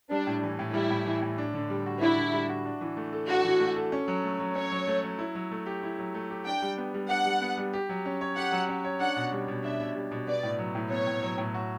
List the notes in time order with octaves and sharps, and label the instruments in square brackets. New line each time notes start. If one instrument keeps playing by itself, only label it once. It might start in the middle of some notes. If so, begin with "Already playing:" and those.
[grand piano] G3 [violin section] D4
[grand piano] A2
E3
A2
[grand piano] G3 [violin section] E4
[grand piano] A2
E3
A2
D4
D3
G3
F#4
[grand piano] D4 [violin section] E4
[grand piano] D3
G3
F#4
D4
E3
A3
A4
[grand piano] D4 [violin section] F#4
[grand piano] E3
A3
A4
C#4
F#3
A3
F#3
[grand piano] C#4 [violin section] C#5
[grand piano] F#3
A3
F#3
E4
F#3
A3
G4
E4
F#3
A3
G4
[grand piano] D4 [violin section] G5
[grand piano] G3
B3
G3
[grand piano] D4 [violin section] F#5
[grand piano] G3
B3
G3
G4
F#3
C#4
C#5
[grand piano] G4 [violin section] F#5
[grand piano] F#3
C#4
C#5
[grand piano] D4 [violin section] F#5
[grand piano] B2
G3
B2
[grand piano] D4 [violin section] E5
[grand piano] B2
G3
B2
[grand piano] B3 [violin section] D5
[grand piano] A2
F#3
A2
[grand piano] B3 [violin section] C#5
[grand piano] A2
F#3
A2
F#4